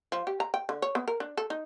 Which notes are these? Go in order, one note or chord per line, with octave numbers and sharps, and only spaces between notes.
F3
G4
A#5
G5
D3
C#5
B3
A#4
D4
A4
D#4